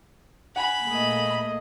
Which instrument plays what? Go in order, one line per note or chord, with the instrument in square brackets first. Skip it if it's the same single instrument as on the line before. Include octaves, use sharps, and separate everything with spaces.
[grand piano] F#5 G#5 [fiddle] B5
[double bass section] A#2 A3 A#3 [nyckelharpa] G#4 D#5